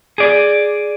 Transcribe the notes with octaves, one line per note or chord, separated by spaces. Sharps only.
G#4 D5